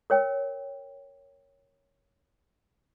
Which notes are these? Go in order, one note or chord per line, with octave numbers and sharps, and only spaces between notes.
A#4 C#5 G5